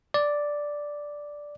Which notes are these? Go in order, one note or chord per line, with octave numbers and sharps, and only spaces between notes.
D5